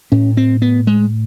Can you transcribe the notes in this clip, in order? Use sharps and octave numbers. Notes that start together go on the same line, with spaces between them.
A2 C#4
C4
B3
G#3